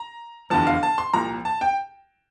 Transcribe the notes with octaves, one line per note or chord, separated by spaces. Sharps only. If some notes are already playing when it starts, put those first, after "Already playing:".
Already playing: A#5
F1 E2 D3 F3 A5
F5
A5
C6
C2 A#2 F3 A#5
A5
G5